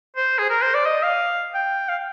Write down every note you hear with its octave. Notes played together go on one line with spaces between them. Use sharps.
C5
G#4
A#4
C5
D5
D#5
F5
G5
F5